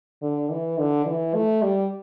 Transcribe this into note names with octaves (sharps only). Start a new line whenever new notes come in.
D3
E3
D3
E3
A3
G3